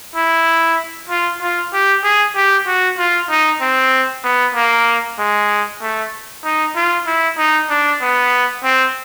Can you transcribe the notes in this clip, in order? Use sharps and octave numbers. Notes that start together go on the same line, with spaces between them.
E4
F4
F4
G4
G#4
G4
F#4
F4
D#4
C4
B3
A#3
G#3
A3
D#4
F4
E4
D#4
D4
B3
C4